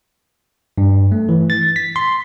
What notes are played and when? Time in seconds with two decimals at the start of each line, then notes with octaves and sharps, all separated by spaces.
0.78 G2
1.12 A3
1.29 E3
1.50 A6
1.76 B6
1.96 C6